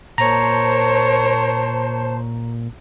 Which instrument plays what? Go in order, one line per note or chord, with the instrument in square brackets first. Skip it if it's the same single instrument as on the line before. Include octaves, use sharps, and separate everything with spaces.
[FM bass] A#2 [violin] A#4 C#5 [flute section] C5 A5 [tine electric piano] A#5